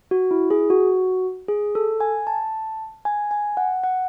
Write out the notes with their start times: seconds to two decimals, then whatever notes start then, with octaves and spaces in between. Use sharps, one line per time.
0.11 F#4
0.31 E4
0.50 G#4
0.70 F#4
1.48 G#4
1.75 A4
2.01 G#5
2.27 A5
3.05 G#5
3.31 G#5
3.57 F#5
3.84 F#5